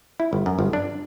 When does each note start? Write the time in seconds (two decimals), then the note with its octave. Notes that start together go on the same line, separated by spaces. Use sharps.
0.20 E4
0.33 G1
0.46 F#2
0.59 G1
0.73 D4